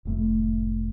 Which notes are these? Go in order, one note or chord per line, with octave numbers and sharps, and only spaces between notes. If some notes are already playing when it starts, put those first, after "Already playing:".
F1 A2 A3